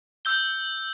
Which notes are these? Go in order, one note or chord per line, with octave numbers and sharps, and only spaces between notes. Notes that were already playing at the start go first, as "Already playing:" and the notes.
E6 G6 G7